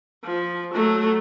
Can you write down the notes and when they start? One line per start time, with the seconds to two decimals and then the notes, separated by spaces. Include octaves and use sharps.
0.24 F3
0.74 F#3 A3